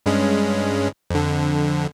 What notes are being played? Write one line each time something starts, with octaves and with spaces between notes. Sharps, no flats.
G2 G#3 C#4
F2 D3